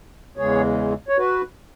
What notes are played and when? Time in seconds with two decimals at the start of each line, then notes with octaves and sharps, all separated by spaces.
0.37 E2 C#3 E3 G#3 G#4 C#5
1.09 C#5
1.17 F#4 B4